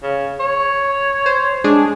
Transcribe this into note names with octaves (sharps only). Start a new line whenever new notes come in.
C#3
C#5
C5
G#3 D4 G#4